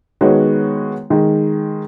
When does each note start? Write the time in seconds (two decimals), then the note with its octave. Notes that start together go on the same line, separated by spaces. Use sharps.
0.21 D#3 G#3 B3 F#4 C#5
1.10 D#3 G#3